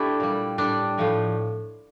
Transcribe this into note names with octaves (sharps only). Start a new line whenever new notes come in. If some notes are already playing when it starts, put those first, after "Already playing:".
Already playing: A3 D4 E4 G4
A#2 G3
A2 G3 D4
A2 F3 A3